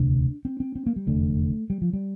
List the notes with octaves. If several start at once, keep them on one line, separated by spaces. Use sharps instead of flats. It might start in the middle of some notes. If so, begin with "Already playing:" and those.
Already playing: E1 D2 C3 D4
C4
C4
C4
A#3
G3
F1 E2 D3 A3
G3
F3
G3